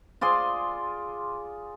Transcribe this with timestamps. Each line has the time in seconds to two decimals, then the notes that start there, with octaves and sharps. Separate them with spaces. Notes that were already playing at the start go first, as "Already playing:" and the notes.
0.21 F4 G#4 D5 C6